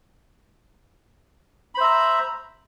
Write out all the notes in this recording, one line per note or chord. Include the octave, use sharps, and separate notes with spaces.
C5 E5 A#5 B5